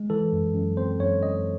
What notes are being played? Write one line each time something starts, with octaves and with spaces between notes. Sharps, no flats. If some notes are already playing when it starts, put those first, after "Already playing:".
Already playing: G#3
E3 A4
F#2
F#2
C4 C5
F#2 C#5
F#2 D#5